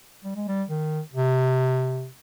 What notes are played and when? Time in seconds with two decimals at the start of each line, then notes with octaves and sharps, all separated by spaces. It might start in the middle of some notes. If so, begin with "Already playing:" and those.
0.24 G3
0.36 G#3
0.48 G3
0.69 D#3
1.13 C3